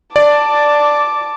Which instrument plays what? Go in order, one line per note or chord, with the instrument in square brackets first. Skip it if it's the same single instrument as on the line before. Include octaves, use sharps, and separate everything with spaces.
[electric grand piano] D5 [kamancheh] A5 D6